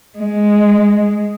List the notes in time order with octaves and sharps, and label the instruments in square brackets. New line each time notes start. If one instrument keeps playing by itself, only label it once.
[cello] G#3